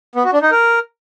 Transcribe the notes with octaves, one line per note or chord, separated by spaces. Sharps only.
B3
F#4
D4
D#4
A#4